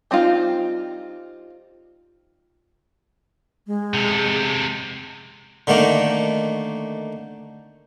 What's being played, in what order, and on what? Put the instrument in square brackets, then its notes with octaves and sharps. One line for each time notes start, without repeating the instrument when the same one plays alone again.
[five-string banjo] G3 C4 D#4 F4
[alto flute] G#3
[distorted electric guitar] C3 A4
[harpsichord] D3 D#3 A3 A#3